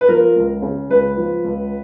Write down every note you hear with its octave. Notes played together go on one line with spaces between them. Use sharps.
B4
F3 A#4
C#2
C#3
C#2 B4
F3
C#2